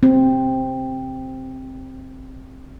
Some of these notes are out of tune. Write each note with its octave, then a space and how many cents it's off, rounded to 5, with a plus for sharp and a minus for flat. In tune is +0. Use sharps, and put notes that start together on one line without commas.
C4 +5